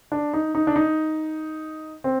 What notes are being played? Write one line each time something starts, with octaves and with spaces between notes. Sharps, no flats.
D4
D#4
D#4
D4
D#4
C4